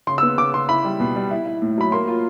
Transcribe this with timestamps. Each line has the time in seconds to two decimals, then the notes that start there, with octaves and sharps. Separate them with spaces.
0.07 C#3 C6
0.18 E6
0.22 B3
0.38 C#3 D6
0.54 C#3 C6
0.69 E4 B5
0.85 G3
1.00 B2
1.16 G3
1.31 E4
1.46 E4
1.62 A2
1.78 F#3 B5
1.92 A#3 C6
2.08 F4